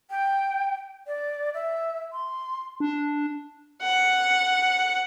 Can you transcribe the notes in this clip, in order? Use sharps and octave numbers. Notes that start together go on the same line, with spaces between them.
G5
D5
E5
C6
D4
F#5